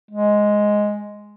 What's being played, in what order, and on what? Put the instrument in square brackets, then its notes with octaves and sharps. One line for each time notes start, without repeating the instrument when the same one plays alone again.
[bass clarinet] G#3